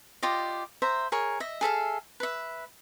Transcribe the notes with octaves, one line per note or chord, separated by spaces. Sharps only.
F4 G4 D5 D#5
C5 E5 A#5
G#4 A#4 C#5
D#5 E5
G#4 A4 E5 F5
B4 E5